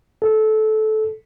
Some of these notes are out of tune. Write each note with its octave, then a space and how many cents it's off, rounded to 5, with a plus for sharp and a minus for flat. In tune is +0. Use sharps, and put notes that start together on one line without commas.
A4 -20